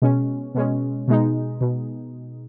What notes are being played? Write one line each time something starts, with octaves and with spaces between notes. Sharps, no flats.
B2 G#3 C#4
B2 G#3 C#4
B2 G#3 D#4
B2